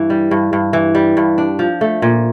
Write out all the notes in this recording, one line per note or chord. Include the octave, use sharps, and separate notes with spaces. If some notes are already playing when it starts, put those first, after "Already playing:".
Already playing: G2 E3
G3
G2
G2
E3
G3
G2
D4
F3
A3
A#2